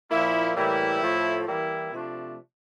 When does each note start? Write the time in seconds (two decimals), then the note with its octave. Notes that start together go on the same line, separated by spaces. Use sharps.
0.11 A#2 F3 A#3 E4
0.56 A2 E3 G3 A#3 E4
1.01 A2 F3 A3
1.46 E3 G3 A#3 E4
1.91 C3 F3 A3 D4